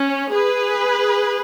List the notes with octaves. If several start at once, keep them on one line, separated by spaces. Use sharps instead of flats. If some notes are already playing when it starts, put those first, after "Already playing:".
Already playing: C#4
G#4 B4